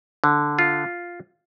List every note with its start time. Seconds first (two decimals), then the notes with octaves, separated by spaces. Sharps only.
0.24 D3
0.59 F4